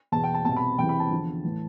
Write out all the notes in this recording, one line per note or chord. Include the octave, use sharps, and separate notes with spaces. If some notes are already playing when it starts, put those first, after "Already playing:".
E2 B2 A5
G5
A5
C2 B2 A5
B5
E2 C3 E3 G5
B5
A5
E2 D3 F3
A2 E3